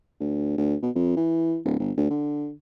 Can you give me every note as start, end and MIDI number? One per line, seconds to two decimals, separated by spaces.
0.20 0.54 38
0.58 0.75 38
0.82 0.90 47
0.95 1.16 41
1.16 1.58 52
1.65 1.75 26
1.79 1.92 31
1.97 2.10 38
2.10 2.52 50